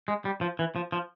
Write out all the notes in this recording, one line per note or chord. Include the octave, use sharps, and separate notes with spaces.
G#3
G3
F3
E3
F3
F3